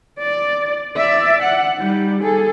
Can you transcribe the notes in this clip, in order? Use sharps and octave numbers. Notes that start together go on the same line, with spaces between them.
D5
D5 E5
F#5
G3 D#4
G#4 A4